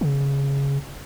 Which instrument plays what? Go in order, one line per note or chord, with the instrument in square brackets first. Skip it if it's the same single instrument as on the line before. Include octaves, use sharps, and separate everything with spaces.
[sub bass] C#3